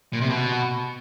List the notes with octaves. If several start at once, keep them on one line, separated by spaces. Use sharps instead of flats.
A#2
C3
B2